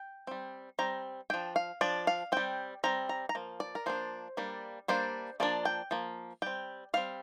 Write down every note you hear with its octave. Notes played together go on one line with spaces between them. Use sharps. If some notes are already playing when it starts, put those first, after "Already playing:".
Already playing: G5
G3 C4
G3 C4 A#5
F3 D4 G5
F5
F3 D4 D5
F5
G3 C4 G5
G3 C4 A#5
A#5
A#5
F3 A#3
D5
A#4
F3 A#3 D4 C5
G3 A#3 D4
G3 A#3 D4 C5
F3 A#3 D4 D5
G5
F3 A#3
G3 C4 G5
G3 C4 F5